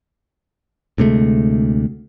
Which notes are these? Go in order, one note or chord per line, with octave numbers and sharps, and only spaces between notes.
D2 C3 G#3 A3